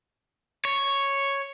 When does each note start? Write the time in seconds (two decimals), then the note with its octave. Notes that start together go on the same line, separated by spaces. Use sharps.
0.65 C#5